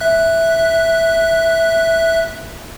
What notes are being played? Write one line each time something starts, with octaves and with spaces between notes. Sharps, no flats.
E5 F#6